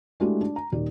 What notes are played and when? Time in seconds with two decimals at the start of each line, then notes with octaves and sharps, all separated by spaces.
0.20 G#3 A3 D4 E4 F#4 G4
0.41 D4
0.56 A#5
0.72 D#1 D#3 G4 D5